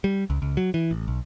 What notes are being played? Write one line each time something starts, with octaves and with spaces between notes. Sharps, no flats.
G3
C#2
C#2
F#3
E3
A1
B1